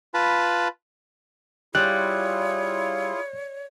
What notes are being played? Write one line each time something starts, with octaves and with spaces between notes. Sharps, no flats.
F4 B4 A5 B5
G3 E4 F4 G#4 C#5 F#6